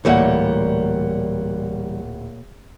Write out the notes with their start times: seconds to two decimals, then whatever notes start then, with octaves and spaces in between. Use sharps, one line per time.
0.05 D1 A#2 E3 G3 A3 A#3 C#5 F#5